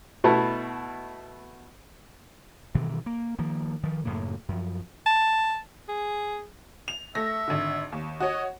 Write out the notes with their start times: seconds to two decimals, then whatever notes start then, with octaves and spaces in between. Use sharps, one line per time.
0.24 B2 A3 B3 E4
2.75 G2 B2 D#3 E3
3.06 A#3
3.39 D#3 F3 A#3
3.83 D#3 F3
4.05 F#2 A2 C#3 A#3
4.49 F#2 F3
5.06 A5
5.88 G#4
6.88 F7
7.15 A3 E5 A#6
7.48 G#1 D3
7.92 D#2
8.20 F#4 C#5 D#5